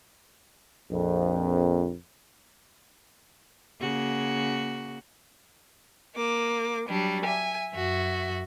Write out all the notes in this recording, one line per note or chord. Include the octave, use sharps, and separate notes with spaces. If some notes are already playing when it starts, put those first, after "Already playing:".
A#1 F2
C#3 A#3 F#4
A#3 D6
F#3 G3 D4
E5 G#5
F#2 F#4 E5